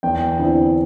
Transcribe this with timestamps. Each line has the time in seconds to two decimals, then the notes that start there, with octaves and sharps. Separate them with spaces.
0.03 E2 G5
0.39 D3 C4 E4